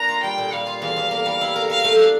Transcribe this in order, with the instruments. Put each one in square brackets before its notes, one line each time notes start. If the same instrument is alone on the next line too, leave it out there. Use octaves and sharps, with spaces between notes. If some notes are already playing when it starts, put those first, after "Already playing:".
Already playing: [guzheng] A#3 D4 [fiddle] A#5
[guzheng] F4
[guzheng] G3 [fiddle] G5
[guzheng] A#2
[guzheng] G3 [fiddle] F5
[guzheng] F4
[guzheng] E2 [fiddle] F5
[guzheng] E2
A#3
G3
E4
A#4
[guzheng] A#4 [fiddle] F5
[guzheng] A3
D4